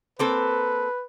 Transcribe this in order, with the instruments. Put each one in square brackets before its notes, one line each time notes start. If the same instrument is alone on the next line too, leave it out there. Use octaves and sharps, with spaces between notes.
[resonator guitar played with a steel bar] A#3 C4 A4 [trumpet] B4